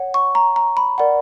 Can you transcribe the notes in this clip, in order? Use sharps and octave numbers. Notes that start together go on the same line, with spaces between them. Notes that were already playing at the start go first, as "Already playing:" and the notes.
Already playing: C#5 F#5
C#6
A#5
A#5
B5
A#4 D5 F#5